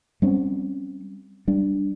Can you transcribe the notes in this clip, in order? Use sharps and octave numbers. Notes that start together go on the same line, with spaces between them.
G3 C4 C#4
G3 D4